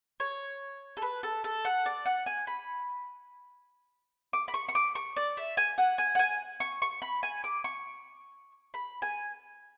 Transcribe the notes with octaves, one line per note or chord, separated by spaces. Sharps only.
C#5
A4
B4
A4
A4
F#5
D5
F#5
G#5
B5
D6
B5
C#6
C#6
D6
C#6
D5
E5
G#5
F#5
G#5
F#5
G#5
C#6
C#6
B5
G#5
D6
C#6
B5
G#5